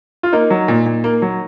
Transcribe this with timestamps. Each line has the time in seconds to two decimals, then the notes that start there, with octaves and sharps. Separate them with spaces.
0.23 F4
0.32 A#3 D#4
0.50 F#3
0.68 A#2
0.86 A#2
1.04 A#3
1.22 F#3